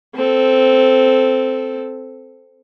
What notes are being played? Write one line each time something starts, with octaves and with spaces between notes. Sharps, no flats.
C4 A4